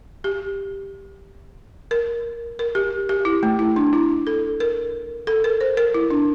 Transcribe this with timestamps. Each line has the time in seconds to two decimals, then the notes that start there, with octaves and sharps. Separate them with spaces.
0.24 G4
1.91 A#4
2.59 A#4
2.75 G4
3.09 G4
3.25 E4
3.43 A3
3.59 E4
3.76 D4
3.93 E4
4.27 A4
4.60 A#4
5.27 A4
5.44 A#4
5.61 C5
5.77 A#4
5.94 E4
6.10 D4